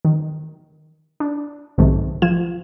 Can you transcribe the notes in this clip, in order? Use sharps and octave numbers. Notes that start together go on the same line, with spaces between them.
D#3
D4
B1 G#2 C3 D#3 G#3 A3
F3 F4 G#6 E7